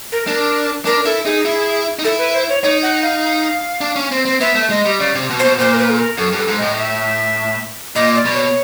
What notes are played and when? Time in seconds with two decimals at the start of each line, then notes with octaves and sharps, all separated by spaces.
0.12 A#4
0.27 D4 A#4
0.85 D4 A#4
1.05 E4 A4
1.25 D#4 G#4
1.45 E4
1.99 D#4
2.04 E4 A4
2.19 B4
2.34 C5
2.49 C#5
2.63 D#4 C#5
2.82 F#5
3.03 F5
3.81 D4
3.96 C#4
4.12 C4
4.25 C4
4.41 B3 E5
4.55 A3
4.70 G#3 D#5
4.86 G3
5.00 C#3 D5
5.15 C3
5.30 B2
5.39 C5
5.44 B2
5.58 A#2 C5
5.74 A#4
5.78 B4
5.90 A4
5.98 A#4
6.17 F#2 A4
6.33 G2
6.38 A4
6.48 G#2
6.58 A2 D#5
6.77 E5
7.96 A#2 D#5
8.15 D5
8.26 B2
8.34 C#5